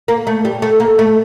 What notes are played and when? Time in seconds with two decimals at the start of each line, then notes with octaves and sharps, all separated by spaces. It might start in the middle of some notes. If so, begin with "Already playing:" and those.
0.08 A#3
0.27 A3
0.45 G3
0.62 A3
0.80 A#3
0.99 A3